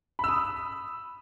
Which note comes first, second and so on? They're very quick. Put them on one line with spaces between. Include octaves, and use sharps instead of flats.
B5 E6 D#6